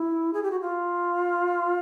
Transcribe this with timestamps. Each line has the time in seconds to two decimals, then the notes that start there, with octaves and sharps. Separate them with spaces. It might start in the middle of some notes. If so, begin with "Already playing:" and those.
Already playing: E4
0.34 G#4
0.43 G4
0.51 F#4
0.61 F4